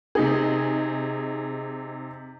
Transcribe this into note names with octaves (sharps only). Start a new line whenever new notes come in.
C3 D#4 G#4